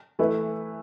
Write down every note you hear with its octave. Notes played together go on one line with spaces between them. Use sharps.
E3 A3 E4 B4